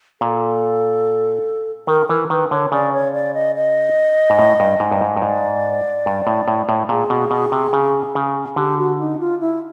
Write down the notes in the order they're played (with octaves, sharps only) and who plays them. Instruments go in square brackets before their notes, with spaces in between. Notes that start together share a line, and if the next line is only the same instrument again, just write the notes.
[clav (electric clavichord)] A#2 [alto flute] A4
[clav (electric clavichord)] D#3 [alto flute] A#4
[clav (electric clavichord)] E3 [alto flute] A#4
[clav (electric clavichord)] D#3 [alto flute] B4
[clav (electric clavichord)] D3 [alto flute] C#5
[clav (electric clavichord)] C#3 [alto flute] D5
[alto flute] C#5
D5
D#5
D#5
[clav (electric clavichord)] G#2
A2
G2
G#2
G2
G#2
G2
[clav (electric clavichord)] G#2 [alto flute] D5
[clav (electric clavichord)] G2
A2
A2
A2
[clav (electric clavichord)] A#2 [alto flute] G#4
[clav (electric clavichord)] B2
B2
C3
C#3
C#3
[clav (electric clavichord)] D3 [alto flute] G4
[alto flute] F#4
D#4
F4
E4